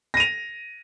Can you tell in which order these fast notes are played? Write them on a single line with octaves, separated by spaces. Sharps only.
A#6 D#7 F7